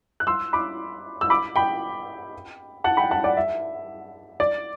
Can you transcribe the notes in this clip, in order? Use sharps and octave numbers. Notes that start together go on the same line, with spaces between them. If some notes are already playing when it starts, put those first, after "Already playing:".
F#6
C6 E6
B5 D6
E6
B5 D6
G5 B5
F#5 A5
G5 B5
F#5 A5
D5 F#5
E5
D5